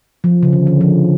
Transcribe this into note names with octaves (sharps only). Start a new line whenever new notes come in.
F3
C#3
D3
D3
F3